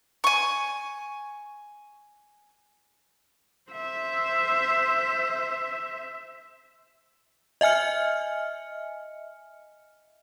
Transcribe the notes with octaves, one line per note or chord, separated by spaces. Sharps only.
G#5 C#6
C5 E5
D#5 E5 G#5 F6 C#7